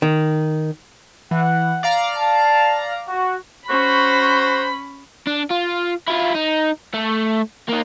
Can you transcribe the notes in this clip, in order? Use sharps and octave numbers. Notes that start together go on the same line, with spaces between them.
D#3
E3 F#5
D5 F5 A#5
A5
F#4
C#4 F#4 C5 B5
D4
F4
E4 F4
D#4
A3
A#3 D#4